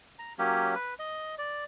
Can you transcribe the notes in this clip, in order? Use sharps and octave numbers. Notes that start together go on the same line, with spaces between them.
A#5
F#3 A#3 C#4 G4
B4
D#5
D5